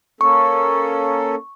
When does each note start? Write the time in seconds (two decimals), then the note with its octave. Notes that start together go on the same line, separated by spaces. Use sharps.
0.21 A#3 C#4 A4 C#6